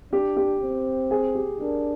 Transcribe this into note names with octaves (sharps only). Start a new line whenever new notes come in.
D4 G4
G4
C4
G#4
G4
D4 A#4